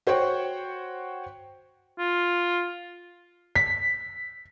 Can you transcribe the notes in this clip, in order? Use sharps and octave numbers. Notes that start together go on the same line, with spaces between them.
F#4 C5 C#5 F#5 G5
F4
B6